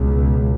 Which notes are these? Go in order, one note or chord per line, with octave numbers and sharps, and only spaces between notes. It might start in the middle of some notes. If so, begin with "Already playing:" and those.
Already playing: C#2 B2